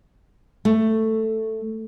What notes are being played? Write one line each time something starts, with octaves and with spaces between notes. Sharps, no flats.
A3